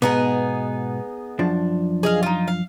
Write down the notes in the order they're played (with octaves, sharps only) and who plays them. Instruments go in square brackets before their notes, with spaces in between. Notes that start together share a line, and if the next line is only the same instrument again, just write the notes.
[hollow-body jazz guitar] G#2 B2 [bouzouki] B3 D#4 G#4
[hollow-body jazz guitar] F#2 F3 D4
[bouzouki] G#4 D#5 F5
D#4 F4
F5